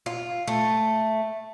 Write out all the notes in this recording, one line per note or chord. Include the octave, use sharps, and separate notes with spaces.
F4
A3